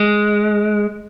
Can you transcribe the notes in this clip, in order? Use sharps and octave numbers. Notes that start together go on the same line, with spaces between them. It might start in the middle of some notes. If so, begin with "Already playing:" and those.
Already playing: G#3